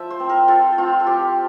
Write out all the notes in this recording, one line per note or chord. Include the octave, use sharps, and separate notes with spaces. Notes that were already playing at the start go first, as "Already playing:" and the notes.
Already playing: F3 E5
C5
C4
A#4
F4 A4
C4 F4
A4
F3 G4